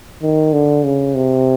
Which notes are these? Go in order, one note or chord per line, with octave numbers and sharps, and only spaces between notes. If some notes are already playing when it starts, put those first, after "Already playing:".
D#3
D3
C#3
C3